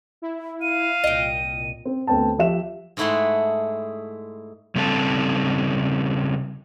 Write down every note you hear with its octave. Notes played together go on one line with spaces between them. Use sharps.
E4
F5 D#7
C2 A#2 D#5 G5
C4
D2 B3 C4 G5 A5
F3 G4 E5 E7
G#2 G#3 A3 E4 F#5 C6
C#3 G3 C4 A4 D#5 A5